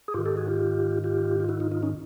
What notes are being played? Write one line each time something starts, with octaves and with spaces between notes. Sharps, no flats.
G#4
G#2 D#3 F4 G4
G4 A4
F#4 G#4
F4 G4
F4 G4
F4
E4 F#4
D#4 F4
D#4 F4
C#4 D#4